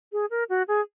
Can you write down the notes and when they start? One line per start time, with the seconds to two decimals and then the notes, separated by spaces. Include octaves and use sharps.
0.12 G#4
0.30 A#4
0.49 F#4
0.68 G#4